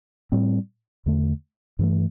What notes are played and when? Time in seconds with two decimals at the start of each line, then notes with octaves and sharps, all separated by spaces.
0.32 A2 G3 C4
1.06 E2 D3 A3
1.79 G2 E3 A3